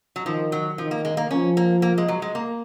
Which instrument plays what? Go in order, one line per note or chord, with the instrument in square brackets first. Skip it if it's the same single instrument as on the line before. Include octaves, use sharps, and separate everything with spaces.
[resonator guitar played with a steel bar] F#3
[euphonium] D#3 [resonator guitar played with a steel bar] F3
[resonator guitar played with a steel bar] F#3
[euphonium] D#3 [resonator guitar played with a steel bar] F3
[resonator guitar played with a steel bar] A#3
G#3
A#3
[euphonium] F3 [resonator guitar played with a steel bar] C#4
[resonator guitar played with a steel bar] A#3
A#3
G#3
F#3
G#3
A#3